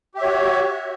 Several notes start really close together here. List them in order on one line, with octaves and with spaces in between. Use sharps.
G4 E5 C#5 F#4